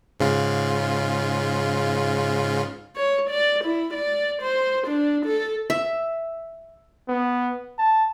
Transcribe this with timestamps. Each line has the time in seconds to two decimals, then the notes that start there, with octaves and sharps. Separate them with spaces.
0.20 G#2 C#3 F4
2.96 C#5
3.30 D5
3.64 E4
3.93 D5
4.42 C5
4.87 D4
5.26 A4
5.70 E5
7.09 B3
7.78 A5